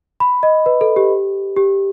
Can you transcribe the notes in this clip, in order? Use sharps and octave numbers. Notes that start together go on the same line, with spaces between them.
B5
D#5
B4
A4
G4
G4